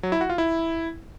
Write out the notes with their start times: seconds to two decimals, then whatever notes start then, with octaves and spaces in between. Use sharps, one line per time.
0.03 F#3
0.12 E4
0.21 F#4
0.30 F4
0.38 E4